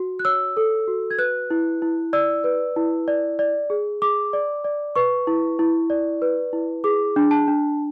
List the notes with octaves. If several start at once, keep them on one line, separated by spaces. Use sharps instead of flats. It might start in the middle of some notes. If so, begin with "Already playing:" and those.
Already playing: F#4
F#6
C#5 E6
A4
F#4
G#6
B4 F#6
E4
E4
D5 E6
B4
E4
D5
D5
G#4
G#4 D6
D5
D5
B4 C#6
E4
E4
D5
B4
E4
G#4 D6
D4
A5
D4